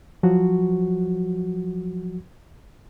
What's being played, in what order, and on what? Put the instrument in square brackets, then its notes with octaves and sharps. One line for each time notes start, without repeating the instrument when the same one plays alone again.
[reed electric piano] F3 F#3 F#4